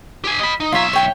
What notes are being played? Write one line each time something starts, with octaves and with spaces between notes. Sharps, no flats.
G4 G#5
D#5 B5
D#4
B1 F4 C#5 E5 A#5
C#5 G5 C#6